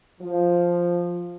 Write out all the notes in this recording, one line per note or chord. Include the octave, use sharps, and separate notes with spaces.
F3